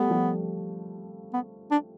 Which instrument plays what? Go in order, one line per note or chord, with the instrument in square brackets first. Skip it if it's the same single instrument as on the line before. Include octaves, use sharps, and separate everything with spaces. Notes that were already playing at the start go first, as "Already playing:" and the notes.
Already playing: [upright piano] G3 A3 [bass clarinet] B3
[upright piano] F3 G3
[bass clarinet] B3
D4